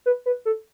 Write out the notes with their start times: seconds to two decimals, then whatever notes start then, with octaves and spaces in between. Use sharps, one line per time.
0.06 B4
0.26 B4
0.45 A4